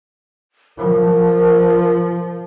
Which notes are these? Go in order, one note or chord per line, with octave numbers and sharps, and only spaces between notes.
F3 A#4